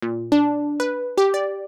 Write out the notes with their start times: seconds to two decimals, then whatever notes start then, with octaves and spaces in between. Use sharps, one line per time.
0.02 A#2
0.32 D4
0.80 B4
1.18 G4
1.34 D5